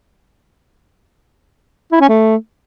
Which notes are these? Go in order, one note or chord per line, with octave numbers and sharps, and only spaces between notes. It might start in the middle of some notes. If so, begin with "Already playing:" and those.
E4
C#4
A3